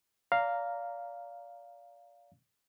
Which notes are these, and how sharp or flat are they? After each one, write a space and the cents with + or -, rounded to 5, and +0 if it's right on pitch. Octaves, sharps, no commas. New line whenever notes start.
D5 -30 F5 +0 A#5 -5